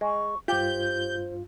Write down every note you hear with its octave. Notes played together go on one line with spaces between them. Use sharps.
G#3 C#6
G2 F4 G4 C5 G6